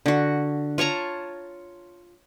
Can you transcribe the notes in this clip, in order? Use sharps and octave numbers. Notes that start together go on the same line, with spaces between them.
D3 F#4
F4 C#5 A5 A#5